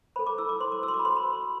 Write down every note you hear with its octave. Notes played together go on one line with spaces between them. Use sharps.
A4 C5 B5
D6
E4 E6
D6
A4 C5 C6
D6
F#4 E6
C6
D6
B5
C5 C6
B5
F#4